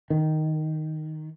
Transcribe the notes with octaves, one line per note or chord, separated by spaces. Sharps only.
D#3